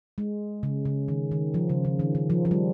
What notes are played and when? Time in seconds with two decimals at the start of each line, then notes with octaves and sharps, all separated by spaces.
0.18 G#3
0.63 C#3
0.85 C#3
1.08 D#3
1.32 D#3
1.54 F3
1.69 C#3
1.85 C#3
1.99 D#3
2.15 D#3
2.30 F3
2.45 F3
2.51 G3